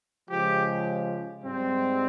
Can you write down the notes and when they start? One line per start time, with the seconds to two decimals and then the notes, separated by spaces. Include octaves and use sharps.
0.30 C#3 F3 G#3 G4
1.43 G#2 G3 C4